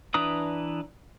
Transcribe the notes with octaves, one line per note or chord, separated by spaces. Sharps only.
E3 D4 B4 A#5 D#6